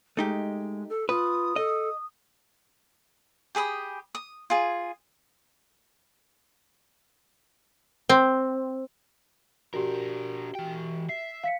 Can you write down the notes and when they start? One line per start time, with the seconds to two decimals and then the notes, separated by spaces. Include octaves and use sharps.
0.17 G#3 A3 D#4 G4
0.89 A4
1.09 F4 B4 D#6
1.56 A4 D#5
3.55 G4 G#4 B5 D#6
4.15 D#6
4.50 F4 G#4
8.09 C4
9.74 D4 F#4 G4 A#4
10.55 E3 G5
11.09 E5 C7
11.44 F5 B6 C#7